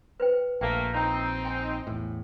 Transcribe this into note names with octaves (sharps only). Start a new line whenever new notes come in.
B4 C5 G5
A#1 A3 A#3 G5
C4 D#4 A#5
G5 G#5
E2 A2